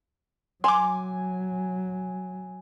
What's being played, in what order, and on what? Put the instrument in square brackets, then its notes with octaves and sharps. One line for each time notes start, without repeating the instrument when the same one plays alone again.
[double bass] F#3 [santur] G#5 [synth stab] C6 D6